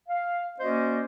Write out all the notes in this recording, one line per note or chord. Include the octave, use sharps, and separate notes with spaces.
F5
A#3 C#4 F#4 C5 D5 D#5